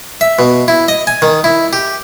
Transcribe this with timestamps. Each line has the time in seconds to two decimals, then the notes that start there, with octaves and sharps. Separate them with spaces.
0.21 E5
0.39 B2
0.68 E4
0.88 D#5
1.07 G#5
1.22 D#3
1.44 E4
1.73 G4